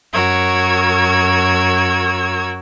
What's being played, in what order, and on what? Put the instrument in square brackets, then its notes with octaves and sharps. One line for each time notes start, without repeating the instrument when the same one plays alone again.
[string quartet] F#2 F#4 A#4 C#5 E6 G#6